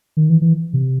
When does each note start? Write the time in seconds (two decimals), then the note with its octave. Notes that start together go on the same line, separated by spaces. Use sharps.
0.17 D#3
0.30 E3
0.42 E3
0.73 C3